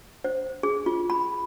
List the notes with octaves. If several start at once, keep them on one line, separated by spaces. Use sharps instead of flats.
C5
G#4
F4
B5